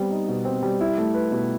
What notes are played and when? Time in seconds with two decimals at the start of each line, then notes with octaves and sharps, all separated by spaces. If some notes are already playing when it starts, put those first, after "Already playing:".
Already playing: G3 B3 C4
0.10 D#4
0.28 B2
0.45 C4
0.63 G3
0.81 E4
0.98 A3
1.14 B4
1.32 B2